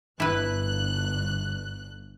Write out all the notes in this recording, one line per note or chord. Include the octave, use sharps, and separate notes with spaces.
G1 E4 B4 F#6